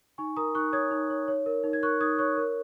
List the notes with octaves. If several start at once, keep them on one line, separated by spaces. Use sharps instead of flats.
D#4 G#5 C#6
A#4 A#5 D#6
D#4 C#6 F#6
C#5 D#6 G#6
D#4
C#5
C#5
A#4
D#4
G#6
A#4 C#6 F#6
D#4 D#6 G#6
C#5 C#6 F#6
A#4